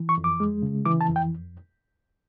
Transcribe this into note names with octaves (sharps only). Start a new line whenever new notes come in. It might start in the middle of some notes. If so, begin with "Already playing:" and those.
Already playing: E3
C#6
F2
D6
G#3
C#3
E3 D6
A5
F2
G5